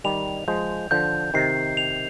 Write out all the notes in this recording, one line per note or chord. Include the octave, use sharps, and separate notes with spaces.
D#3 G3 F7
F3 G#3 G6
D3 F3 G6
C3 D#3 C7
F7